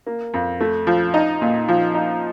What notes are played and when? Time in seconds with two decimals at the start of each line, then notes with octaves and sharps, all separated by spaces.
0.06 A#3
0.34 F2
0.60 A3
0.87 F3
1.14 D#4
1.41 A#2
1.68 F3
1.95 D#4